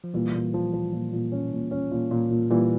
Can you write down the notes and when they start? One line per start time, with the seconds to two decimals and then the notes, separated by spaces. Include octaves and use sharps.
0.04 F3
0.14 A#2 E3 G3
0.34 A#2
0.54 F3
0.73 F3
0.93 A#2
1.12 A#2
1.32 C#4
1.52 A#2
1.71 C#4
1.91 A#2
2.11 A#2
2.31 A#2
2.50 A#2 E3 G3